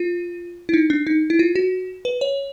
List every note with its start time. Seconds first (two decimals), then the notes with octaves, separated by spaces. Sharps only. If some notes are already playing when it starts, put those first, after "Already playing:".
Already playing: F4
0.69 E4
0.74 D#4
0.90 D4
1.07 D#4
1.30 E4
1.39 F4
1.55 F#4
2.05 B4
2.21 C#5